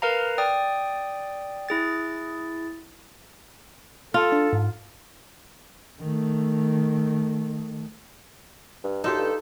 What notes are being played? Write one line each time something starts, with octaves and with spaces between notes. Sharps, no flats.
A#4 B4 F5 A#5
D5 G5 D#6
E4 G#4 A6
F4 A4
D4
G#2
D#3 A3
G2
F#2 D#4 F4 G4 A4
G2